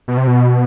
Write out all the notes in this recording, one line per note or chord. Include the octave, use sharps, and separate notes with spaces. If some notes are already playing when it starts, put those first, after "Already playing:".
B2
C3
B2